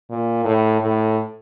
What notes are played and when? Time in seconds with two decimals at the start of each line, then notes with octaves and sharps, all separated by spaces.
0.10 A#2
0.45 A2
0.81 A2